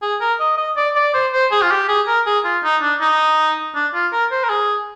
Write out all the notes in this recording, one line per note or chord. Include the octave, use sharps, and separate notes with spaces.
G#4
A#4
D#5
D#5
D5
D5
C5
C5
G#4
F4
G4
G#4
A#4
G#4
F4
D#4
D4
D#4
D4
F4
A#4
C5
A#4
G#4